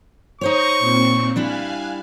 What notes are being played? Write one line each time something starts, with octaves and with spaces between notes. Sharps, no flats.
D#4 C5 C#5 C#6 D#6 G6 A#6
A#2 C4
G3 D4 E4 F5 G#5 F#6